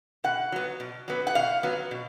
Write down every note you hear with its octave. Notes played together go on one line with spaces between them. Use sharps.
B2 F#5
F#3 B3
B2
F#3 B3
F#5
B2 F5
F#3 B3
B2